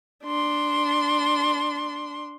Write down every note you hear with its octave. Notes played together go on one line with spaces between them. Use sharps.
D4 C6